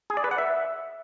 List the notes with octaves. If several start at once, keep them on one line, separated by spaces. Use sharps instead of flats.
G#4
D5
B4
F#5
E5